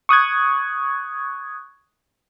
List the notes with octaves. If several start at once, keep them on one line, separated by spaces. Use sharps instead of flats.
C#6 D#6 F#6 G#6